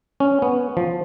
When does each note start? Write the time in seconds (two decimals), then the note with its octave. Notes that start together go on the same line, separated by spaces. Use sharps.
0.20 C#4
0.42 B3
0.77 F3